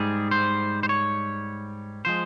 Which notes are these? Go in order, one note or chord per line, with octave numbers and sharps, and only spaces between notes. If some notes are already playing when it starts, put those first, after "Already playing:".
Already playing: G#2 G3 G#4
C5
C5
C#5
F3 G#3 C5